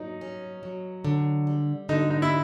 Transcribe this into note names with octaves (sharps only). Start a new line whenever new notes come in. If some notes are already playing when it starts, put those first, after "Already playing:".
Already playing: F#3 D#4
C#4
F#3
D3
G3
D3 D#4
D#4
E4